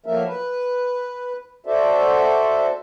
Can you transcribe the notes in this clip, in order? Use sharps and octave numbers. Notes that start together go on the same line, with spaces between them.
F3 F#3 A3 A#3 A#4 E5
B4
F#4 A4 C5 D5 E5